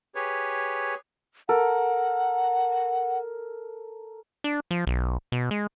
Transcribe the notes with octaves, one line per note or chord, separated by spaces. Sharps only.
G4 G#4 B4 C#5
A4 A#4 F#5
D4
F3
B1
B2
G#3